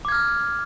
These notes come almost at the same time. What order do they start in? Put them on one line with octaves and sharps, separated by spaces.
D6 G#6 F6